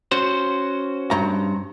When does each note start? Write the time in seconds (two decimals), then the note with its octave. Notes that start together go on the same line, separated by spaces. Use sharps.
0.12 C#4 F#4 C5
1.11 G2 A#5